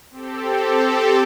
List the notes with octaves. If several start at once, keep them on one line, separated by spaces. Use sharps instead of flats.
C4 G4 A4